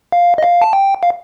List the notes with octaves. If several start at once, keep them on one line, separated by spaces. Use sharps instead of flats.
F5
D#5
F5
A5
G5
F5